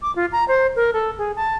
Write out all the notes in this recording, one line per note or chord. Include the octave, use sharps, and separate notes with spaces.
D6
F4
A#5
C5
A#4
A4
G#4
A5